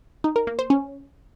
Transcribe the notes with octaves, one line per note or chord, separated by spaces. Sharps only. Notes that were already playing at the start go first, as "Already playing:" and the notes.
D#4
A#4
A#3
C5
C#4